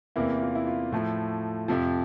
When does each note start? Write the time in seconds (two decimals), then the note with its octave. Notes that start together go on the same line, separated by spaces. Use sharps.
0.16 E2 C3 E3 A#3 E4
0.42 F4
0.55 E4
0.67 F4
0.92 A2 F3 A3
1.68 F2 C3 F3